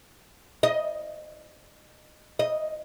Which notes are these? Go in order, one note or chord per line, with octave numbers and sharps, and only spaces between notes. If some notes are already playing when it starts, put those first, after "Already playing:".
D#5
D#5